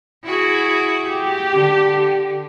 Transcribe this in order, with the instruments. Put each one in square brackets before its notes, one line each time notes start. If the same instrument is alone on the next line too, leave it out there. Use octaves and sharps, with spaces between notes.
[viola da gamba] E4 F#4 G#4
[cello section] G4
[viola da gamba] D3